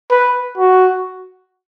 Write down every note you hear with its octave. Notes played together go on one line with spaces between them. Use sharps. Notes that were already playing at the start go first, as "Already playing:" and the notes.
B4
F#4